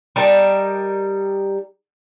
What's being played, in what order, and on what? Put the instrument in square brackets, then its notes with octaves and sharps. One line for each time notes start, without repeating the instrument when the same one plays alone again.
[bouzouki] G3 D#4 A#4 A5